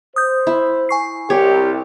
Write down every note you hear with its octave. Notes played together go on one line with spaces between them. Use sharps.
C5 D#6 G6
E4
G#5 C#6 C7
C2 G4 C#5